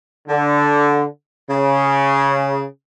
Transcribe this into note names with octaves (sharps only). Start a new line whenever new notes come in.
D3
C#3